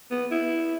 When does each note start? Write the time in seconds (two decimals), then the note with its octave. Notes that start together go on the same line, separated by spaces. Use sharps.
0.11 B3
0.31 E4